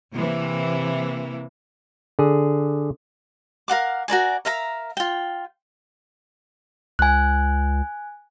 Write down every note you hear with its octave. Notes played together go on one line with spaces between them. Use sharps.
C3 E3 A#3
D3 G#4
A#4 F5 F#5 D6
F#4 A#4 D5 G#5
A#4 E5 F5 A#5
F4 G5
C#2 G#5 F#6